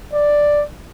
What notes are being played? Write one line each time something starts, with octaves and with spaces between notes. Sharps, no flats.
D5